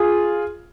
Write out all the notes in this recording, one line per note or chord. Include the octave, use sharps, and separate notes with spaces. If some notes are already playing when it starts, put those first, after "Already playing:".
Already playing: F4 G#4